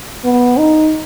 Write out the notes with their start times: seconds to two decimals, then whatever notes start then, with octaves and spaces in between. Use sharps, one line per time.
0.24 B3
0.57 D#4